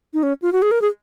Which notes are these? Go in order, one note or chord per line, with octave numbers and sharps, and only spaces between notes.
D#4
C#4
F4
F#4
G#4
A#4
G#4